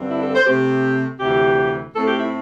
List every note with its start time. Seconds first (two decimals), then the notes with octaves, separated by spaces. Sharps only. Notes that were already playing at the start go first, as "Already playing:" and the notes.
Already playing: G2 D3 C4
0.10 E4
0.22 A4
0.35 C5
0.46 C3 A3 C4 G4
1.20 D2 C3 E3 G4
1.94 A2 A3 C4 A4
2.06 G4
2.19 E4